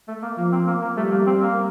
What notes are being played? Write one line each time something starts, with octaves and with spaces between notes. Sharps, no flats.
A3
A#3
F3 A#3
C4
A#3
A#3
G3 A3
A#3
C4
A#3